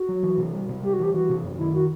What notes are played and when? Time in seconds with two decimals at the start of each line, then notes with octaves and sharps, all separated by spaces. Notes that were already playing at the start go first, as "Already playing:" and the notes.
Already playing: F#4
0.09 F#3
0.23 E3
0.38 C3
0.53 G3
0.69 C3
0.83 G3 G4
0.93 F#4
0.99 E3 G4
1.14 E3 F#4
1.29 C3
1.43 F#2
1.58 D#3 E4
1.74 F#4